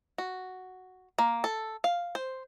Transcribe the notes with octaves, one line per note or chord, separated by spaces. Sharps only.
F#4
A#3
A4
F5
C5